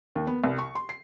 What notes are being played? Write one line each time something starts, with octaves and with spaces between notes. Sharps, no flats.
D#2
B3
C2
C#6
C6
C7